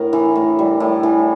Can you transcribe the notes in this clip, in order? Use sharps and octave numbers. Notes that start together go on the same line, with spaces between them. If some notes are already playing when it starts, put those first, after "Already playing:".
Already playing: A2 A#4
E3
A2
G3
A2
E3